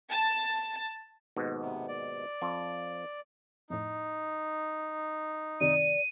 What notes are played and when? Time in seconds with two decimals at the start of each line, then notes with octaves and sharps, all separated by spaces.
0.10 A5
1.36 D#2 G#2 B2
1.61 C3 B3
1.88 D5
2.42 F2 F3
3.70 F2 A2 D#4
5.61 F#2 C3 D#3 D5 D#7